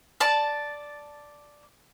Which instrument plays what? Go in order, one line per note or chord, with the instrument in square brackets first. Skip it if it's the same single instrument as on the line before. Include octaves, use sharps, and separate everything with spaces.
[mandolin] D5 A5